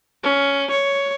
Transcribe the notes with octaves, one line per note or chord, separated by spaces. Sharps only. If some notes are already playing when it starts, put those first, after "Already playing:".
C#4
C#5